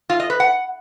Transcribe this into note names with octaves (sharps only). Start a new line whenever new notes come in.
F4
D#5
B4
F#5